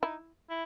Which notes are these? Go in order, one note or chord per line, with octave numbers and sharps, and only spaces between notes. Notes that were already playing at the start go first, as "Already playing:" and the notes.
D#4 E4
E4